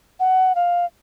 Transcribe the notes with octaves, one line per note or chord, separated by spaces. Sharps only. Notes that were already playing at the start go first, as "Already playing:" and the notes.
F#5
F5